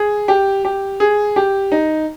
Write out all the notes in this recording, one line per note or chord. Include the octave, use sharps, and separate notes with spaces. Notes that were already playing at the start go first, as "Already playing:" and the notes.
Already playing: G#4
G4
G4
G#4
G4
D#4